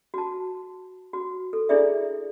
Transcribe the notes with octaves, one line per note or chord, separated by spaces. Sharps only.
F#4 A5
F#4
A4
D4 E4 G#4 A4 D5 E5